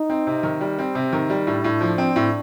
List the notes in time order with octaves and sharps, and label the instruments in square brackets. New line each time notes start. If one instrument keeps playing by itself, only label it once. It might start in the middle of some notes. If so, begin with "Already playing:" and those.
Already playing: [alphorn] D#4
[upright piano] C4
C3
D#3
G3
C4
C3
D#3
G3
[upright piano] A2 [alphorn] D4
[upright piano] A2
F3
C4
A2